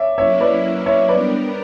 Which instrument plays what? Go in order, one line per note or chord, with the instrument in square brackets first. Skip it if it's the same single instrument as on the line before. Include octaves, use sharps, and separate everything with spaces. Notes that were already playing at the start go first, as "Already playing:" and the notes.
Already playing: [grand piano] C#5 D5 E5
[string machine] F#3 A#3 C#4 E4 [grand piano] C#5 E5
[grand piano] B4 D5
C#5 E5
[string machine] G3 B3 D4 A#4 [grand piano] B4 D5